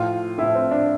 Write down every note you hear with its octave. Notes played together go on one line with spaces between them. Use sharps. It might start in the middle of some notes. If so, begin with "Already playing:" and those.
Already playing: A2 F3 F4
A2 F3 E4
C4
D4